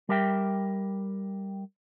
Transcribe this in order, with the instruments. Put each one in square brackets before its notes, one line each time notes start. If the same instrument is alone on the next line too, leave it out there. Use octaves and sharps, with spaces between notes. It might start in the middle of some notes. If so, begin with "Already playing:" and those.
[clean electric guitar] G3 G4 A#4 E5 G5